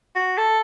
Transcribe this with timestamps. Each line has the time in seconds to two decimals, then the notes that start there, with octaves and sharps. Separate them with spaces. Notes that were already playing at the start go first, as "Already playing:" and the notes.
0.15 F#4
0.38 A4